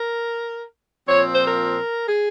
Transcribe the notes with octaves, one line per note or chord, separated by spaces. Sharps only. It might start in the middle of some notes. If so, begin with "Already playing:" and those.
Already playing: A#4
A#2 F3 C4 C#5
C5
A#4
G#4